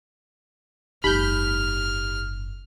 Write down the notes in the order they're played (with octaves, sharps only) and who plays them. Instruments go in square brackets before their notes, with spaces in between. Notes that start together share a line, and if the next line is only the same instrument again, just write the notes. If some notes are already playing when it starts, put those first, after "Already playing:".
[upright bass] F#1 G#2 [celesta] D#4 G4 [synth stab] B5 G6 [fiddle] F6